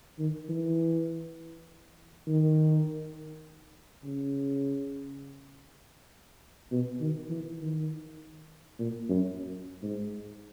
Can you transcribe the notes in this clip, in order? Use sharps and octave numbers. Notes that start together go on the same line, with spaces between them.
D#3
E3
D#3
C#3
B2
D#3
E3
D#3
A#2
F#2
G#2